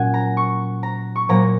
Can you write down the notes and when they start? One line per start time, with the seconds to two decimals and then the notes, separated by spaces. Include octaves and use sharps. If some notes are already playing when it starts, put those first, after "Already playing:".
Already playing: A#2 F#3 C#4 F#5 G#5
0.14 A#5
0.37 C#6
0.83 A#5
1.16 C#6
1.29 A#2 F#3 A#3 A#5